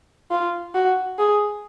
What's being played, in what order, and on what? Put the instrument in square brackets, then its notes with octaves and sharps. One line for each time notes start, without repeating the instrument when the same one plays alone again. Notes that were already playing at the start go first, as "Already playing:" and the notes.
[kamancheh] F4
F#4
G#4